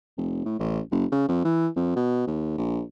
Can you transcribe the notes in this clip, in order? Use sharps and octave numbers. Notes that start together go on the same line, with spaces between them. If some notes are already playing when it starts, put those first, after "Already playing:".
F1
A2
A1
F#1
C#3
F2
E3
F2
B2
D#2
A#1